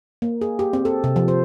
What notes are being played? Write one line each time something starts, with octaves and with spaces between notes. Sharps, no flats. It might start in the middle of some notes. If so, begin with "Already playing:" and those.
A#3
G#4
G4
C4
A4
C3
F3
C5